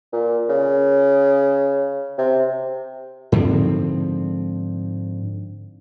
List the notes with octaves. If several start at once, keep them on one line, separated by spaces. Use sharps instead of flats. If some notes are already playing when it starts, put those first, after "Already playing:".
A#2
C#3
C3
G#2 D3 F3 C4